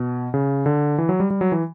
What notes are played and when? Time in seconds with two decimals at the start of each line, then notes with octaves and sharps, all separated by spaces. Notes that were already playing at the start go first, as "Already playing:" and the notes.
Already playing: B2
0.34 C#3
0.66 D3
0.98 E3
1.09 F#3
1.20 G3
1.30 G3
1.41 F#3
1.52 E3